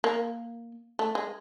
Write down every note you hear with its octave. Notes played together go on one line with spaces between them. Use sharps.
A#3
A3
G#3